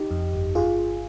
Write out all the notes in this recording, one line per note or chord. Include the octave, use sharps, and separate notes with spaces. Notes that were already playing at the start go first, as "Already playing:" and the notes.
Already playing: D#4 G4
F2
G1
F4 G#4